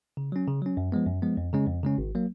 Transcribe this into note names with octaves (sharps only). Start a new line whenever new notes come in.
C#3
F#3 C#4
C#3
F#3 C#4
F#2
F3 G#3 B3
F#2
F3 G#3 B3
F2
C#3 G#3 C#4
F2
C#3 G#3 C#4
G#1
F#3 A#3